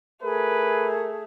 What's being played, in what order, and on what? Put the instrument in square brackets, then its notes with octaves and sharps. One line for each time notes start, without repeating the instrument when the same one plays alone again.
[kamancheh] A3 [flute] G#4 [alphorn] A#4 [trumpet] B4